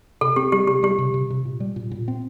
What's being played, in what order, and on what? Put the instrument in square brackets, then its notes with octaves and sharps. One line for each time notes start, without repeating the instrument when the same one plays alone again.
[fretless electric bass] C3 [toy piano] A4
[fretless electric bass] C4 [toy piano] G4
[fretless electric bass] G3 [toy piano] G4
[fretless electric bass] C3 [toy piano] G4
[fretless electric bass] G3 [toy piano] G4
[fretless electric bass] C3
C3
C3
A#2
G3
A#2
A#2
C4